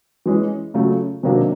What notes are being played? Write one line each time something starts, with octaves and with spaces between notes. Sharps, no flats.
E3 G#3 C#4
C#3 F#3 A3 C#4 F4
C3 D#3 F#3 A#3 D4